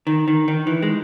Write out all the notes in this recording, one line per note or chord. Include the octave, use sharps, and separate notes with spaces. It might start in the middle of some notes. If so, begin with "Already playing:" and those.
D#3
D#3
D#3
E3
G#3